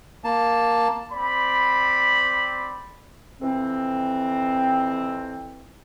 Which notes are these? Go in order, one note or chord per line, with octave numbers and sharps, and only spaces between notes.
A#3 A5
C4 D5 B5
F2 E3 C4